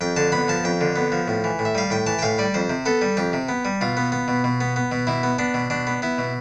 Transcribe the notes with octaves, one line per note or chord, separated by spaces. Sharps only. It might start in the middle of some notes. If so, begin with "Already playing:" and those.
F2 G5
D3 A5
B3 B5
F3 A5
F2 G5
D3
B3
F3
A2
E3
A2
E5
G3 F5
A2 G5
E3 A5
G5
A2 F5
G3 D5
F2 C5
C3
B3 A4
G3
F2 G4
C3
B3
G3
B2 F4
B3
B3
B2
B2
B3
B3
B2
B2 E4
B3
B3 D4
B2
B2 D4
B3
B3 E4
B2